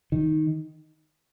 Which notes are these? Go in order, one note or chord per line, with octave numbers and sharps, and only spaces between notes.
D#3